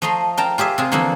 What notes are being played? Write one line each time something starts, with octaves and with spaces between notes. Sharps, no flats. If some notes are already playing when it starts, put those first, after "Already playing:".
F3 A3 D#5 A#5 C6
A#4 G5 A5 A#5
F4 G4 G#4 E5
C3 F4 G#4
D3 E3 F3 A#3 D#4 A4